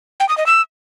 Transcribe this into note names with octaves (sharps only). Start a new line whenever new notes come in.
G5
D#6
D#5
E6